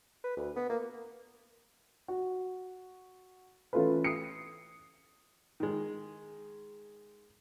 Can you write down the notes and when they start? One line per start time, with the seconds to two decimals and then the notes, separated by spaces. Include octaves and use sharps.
0.24 B4
0.37 D2
0.56 B3
0.69 A#3
2.08 F#4
3.73 E3 A3 C#4 F4 A4 B4
4.04 D#6 C7 C#7
5.60 D#3 G#3